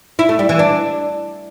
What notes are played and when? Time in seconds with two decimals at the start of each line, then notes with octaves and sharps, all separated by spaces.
0.19 E4
0.29 A3
0.39 G3
0.49 E3
0.59 D4